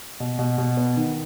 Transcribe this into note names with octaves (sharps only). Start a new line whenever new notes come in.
B2
B2
B2
B3
D#3